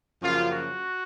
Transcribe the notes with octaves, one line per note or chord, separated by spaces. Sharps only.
F#2 C#3 F3 A#3 F4
F#4